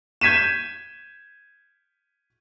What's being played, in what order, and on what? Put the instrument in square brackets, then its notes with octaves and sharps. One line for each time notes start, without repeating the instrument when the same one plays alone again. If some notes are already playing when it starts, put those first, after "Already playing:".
[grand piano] G6 G#6 B6 D#7 E7